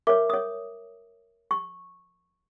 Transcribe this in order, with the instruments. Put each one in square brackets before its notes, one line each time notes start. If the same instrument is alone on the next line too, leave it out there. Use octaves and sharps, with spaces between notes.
[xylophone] A#4 E5 [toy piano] C#5 D6
[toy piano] C#5 D#6
C#6